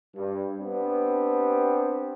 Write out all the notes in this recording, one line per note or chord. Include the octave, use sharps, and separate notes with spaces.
G2
B3 C4 D4 G4